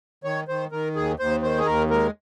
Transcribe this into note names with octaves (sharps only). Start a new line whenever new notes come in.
D#3 C#5
D#3 C5
D#3 A#4
D#2 G#4
D#2 C5
D#3 C5
G#4
D#2 A#4
G#3 A#4